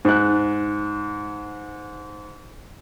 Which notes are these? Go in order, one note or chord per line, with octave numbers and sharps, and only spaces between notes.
G#2 F#6